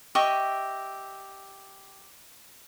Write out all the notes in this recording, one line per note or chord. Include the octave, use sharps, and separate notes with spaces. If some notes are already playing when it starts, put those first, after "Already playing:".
G4 D#5 E5 C#6